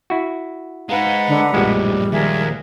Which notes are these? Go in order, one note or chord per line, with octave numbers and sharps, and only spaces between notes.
E4 F#4
G#3 D#4 B4 F5 F#5 A#5
D3
A#1 F#2 A2 F3 G3 G#3
D#2 G#4 A#4 E5